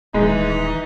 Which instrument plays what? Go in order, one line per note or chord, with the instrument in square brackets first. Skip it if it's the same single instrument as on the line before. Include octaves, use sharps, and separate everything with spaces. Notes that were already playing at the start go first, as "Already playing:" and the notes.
[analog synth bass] D#1 [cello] E3 [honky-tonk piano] G#3 [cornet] D#4